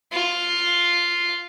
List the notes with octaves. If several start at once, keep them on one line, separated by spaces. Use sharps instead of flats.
F4